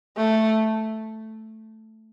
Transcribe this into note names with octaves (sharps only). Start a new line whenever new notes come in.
A3